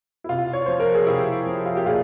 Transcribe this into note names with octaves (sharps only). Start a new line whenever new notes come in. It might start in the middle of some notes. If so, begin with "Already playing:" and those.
E4
C3 F4
C#5
F3 C5
A#4
G#4
C3 E4 G4
F3
F4
G4
A#2 F4 G#4